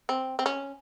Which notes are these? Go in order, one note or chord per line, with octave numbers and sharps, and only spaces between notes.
C4
C4
C#4